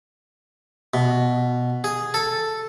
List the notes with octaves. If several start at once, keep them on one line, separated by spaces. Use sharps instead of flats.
B2
G#4
A4